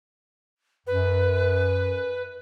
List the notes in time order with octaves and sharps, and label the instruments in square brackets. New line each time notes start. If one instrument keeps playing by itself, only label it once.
[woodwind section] F#2 [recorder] B4